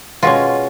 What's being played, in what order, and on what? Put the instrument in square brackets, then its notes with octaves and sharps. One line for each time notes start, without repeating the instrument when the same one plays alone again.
[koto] B2 G#3 C#4 F4